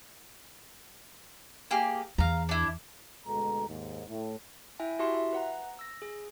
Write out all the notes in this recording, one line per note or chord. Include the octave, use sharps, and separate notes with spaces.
A#3 G4 G#4
E2 F5 A#5
D4 E4
D2 B2 G#3 A4 A#5
D#2 G#2
A2
E4 E5 G5 G#5
E4 F#4 G4 E5 A5 C6
E5
B4 F#5 A#5
E6 A#6
G#4